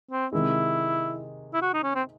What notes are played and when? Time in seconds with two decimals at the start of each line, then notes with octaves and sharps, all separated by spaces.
0.11 C4
0.33 C3 D#3 G#3 E4
1.53 E4
1.62 F#4
1.74 D#4
1.83 C#4
1.95 C4